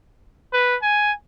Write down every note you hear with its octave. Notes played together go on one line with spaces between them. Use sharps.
B4
G#5